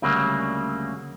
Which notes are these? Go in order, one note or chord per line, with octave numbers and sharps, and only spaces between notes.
D2 C#3 F#3 G3 A#3